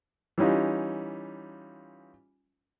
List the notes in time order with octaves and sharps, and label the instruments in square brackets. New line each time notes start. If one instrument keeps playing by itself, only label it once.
[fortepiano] E3 G3 C#4 D#4 F4